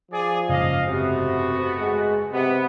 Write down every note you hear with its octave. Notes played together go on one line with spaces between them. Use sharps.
F3 G#4 D5
F#1 G#2 C#3 D#5 F5
C3 A3 B3 F#4
G#3
C3 B3